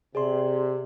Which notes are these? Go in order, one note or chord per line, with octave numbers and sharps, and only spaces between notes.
C3 G#4 D5 C6